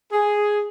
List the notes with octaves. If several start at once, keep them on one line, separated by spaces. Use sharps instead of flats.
G#4